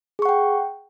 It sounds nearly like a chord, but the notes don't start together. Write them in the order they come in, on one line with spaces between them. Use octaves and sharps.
G#4 C#6 F#5 G5